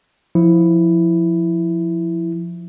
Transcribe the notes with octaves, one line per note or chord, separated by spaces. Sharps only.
F3 E4